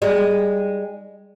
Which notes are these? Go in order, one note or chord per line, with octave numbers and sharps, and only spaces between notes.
G3 G#3 D#4